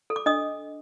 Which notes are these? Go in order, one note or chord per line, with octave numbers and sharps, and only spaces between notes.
A4
D6
D4 D#5 D#6